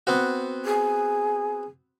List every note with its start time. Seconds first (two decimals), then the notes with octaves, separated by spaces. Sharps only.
0.07 B3 C4 F#4
0.65 G#4